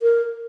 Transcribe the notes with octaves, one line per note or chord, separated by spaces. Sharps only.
A#4